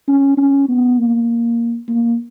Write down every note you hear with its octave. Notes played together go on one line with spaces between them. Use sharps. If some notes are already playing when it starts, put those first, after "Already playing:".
C#4
C#4
B3
A#3
A#3